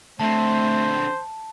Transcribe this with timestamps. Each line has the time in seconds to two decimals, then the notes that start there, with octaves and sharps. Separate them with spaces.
0.20 D3 A3 C4 C5 A5